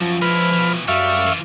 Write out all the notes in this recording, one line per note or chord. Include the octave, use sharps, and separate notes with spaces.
F#2 F3
G#3 E4 B4 F6
B2 E3
F#2 G3 E5 F5 C#6
E3 F4